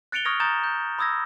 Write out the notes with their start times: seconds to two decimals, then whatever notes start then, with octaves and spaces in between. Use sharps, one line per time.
0.12 F#6 A6 C#7 D7 F7 G7
0.25 C#6 D#6 F6 G#6 A#6 F7
0.40 A#5 D#6 G6 A6 E7
0.64 G6
0.99 B5 D#6 E6 G#6 A#6